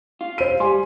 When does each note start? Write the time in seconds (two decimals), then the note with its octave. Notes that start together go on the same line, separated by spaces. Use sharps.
0.21 F4
0.38 C5 D#7
0.60 G3 G#5 C6